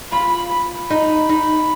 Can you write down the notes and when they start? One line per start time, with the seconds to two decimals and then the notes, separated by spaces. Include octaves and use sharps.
0.12 F4 B5
0.90 D#4 B5
1.29 D#4